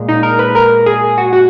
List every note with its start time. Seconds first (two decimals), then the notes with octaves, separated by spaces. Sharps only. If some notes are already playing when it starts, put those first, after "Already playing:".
Already playing: A#2 G#3
0.09 D#4
0.23 A#4
0.39 B4
0.55 A#4
0.86 G#4
1.18 F#4
1.33 F#4